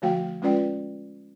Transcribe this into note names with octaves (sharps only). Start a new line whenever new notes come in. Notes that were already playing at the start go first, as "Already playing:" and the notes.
D3 F3 A3 F#4 F5 G5
G#3 C#4 F4 B4 D5 G5